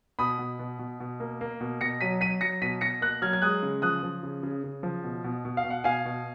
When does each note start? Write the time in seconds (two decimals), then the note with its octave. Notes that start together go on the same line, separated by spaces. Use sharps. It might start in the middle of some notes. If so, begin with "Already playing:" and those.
0.19 B2 B5 D#6
0.39 B2
0.59 B2
0.79 B2
1.00 B2
1.20 A#3
1.41 A#3
1.61 B2
1.81 B2 A#6 C#7
2.01 F#3 B6 D#7
2.21 F#3 B6 D#7
2.41 F#3 A#6 C#7
2.62 B2 B6 D#7
2.81 B2 A#6 C#7
3.01 A#3 F#6 A#6
3.22 F#3 F6 G#6
3.33 G#6
3.42 G#3 D#6 F#6
3.63 C#3
3.82 F3 D#6 F#6
4.03 F3
4.23 C#3
4.43 C#3
4.64 C#3
4.83 F3
5.04 B2
5.24 B2
5.45 B2
5.57 F5
5.64 B2
5.70 F#5
5.84 B2 F5 G#5
6.05 B2